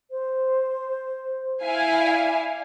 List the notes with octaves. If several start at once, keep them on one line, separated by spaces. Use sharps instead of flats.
C5
E4 F5 G#5
D5